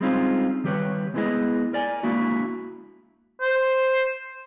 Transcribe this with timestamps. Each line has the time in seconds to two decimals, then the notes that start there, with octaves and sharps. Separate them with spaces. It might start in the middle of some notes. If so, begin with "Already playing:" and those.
0.01 G3 G#3 C4 C#4 D#4 F4
0.64 D#3 G3 G4 B4 C#5
1.14 G#3 A3 B3 E4 G#4 D#5
1.73 A#4 D5 G#5
2.03 G#3 A#3 D4 E4 F#4
3.42 C5